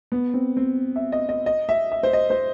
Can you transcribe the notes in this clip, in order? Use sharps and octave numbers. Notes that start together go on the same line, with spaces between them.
B3
C4
C4
E5
D#5
D#5
D#5
E5
E5
C5
D#5
C5